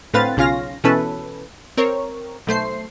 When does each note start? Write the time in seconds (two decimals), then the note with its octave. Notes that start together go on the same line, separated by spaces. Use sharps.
0.13 A2 D3 C4 B4 F5 A6
0.37 B1 C#3 C#4 F4 F5 A#6
0.84 B2 E3 C#4 A4 B4
1.77 C4 A#4 C#5
2.47 B1 A3 C5 C7